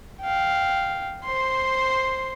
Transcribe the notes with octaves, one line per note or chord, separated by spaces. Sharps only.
F5 G5
C5 C6